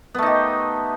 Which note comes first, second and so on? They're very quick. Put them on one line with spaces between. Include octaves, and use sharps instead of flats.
B3 A3 D#4 G4